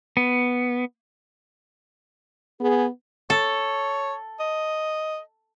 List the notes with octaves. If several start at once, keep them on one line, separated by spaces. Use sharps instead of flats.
B3
B3 G#4
A4 C#5
D#5